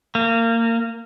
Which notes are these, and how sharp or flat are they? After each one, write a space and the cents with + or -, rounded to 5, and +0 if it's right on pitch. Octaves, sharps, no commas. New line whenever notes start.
A#3 -25